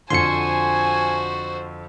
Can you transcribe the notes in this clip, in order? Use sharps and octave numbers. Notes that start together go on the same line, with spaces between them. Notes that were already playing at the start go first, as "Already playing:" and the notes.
F2 D3 F3 F#4 C5 G#5 C6 C#7